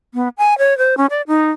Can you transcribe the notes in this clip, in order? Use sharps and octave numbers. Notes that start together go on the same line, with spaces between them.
B3
G#5
C#5
C5
C#4
D5
D#4